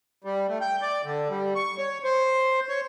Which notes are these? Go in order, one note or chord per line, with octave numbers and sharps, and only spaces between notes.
G3
A3
G5
D5
D3
G3
C#6
C#5
C5
C#5